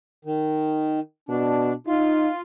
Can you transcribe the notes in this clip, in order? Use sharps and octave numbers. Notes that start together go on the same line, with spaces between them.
D#3
B2 D4
D#4 F4